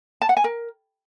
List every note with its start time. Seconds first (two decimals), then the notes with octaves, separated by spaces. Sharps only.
0.22 A5
0.29 F#5
0.37 G#5
0.44 A#4